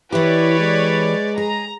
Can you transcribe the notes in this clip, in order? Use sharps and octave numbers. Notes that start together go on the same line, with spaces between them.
E3 E4 G4 B4 C#5 D5
G#3
G#4 A#5